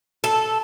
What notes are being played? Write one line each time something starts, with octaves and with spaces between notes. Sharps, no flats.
A4